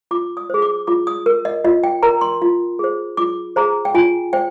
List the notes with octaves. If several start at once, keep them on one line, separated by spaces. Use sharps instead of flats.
F4 D6
D#6
G#4 C5
D6
F4 D6
D#6
A#4
D#5
F4 D#5
G5
A#4 A#5
C6
F4
G#4 C5
F4 D6
G#4 C5 A#5
G5
F4 G#5
C5 G5